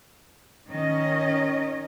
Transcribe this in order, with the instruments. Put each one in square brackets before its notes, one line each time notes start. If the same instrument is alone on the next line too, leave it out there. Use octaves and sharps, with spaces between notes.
[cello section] D#3 C#4 D#5